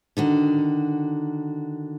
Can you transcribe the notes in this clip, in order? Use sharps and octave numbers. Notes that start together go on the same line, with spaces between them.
D3 D#3 F#4